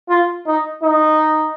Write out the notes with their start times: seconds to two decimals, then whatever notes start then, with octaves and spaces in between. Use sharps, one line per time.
0.08 F4
0.46 D#4
0.83 D#4